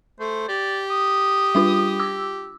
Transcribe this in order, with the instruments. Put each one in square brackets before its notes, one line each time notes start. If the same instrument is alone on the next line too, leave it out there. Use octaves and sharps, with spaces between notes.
[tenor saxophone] A3 [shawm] C5
[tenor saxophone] G4 [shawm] D5
[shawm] D#6
[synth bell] G3 D4 F4
D6 E6